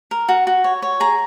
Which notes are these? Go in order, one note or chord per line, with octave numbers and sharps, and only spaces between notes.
A#4
F#4
F#4
C#5
C#5
G#4 A#5